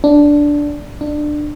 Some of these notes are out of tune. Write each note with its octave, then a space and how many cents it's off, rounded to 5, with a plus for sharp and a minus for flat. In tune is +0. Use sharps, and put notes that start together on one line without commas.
D4 -5
D4 +20